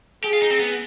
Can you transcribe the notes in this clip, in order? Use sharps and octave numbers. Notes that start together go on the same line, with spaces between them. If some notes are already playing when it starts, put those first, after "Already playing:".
G4 G#4
F4
D#4
C4
B3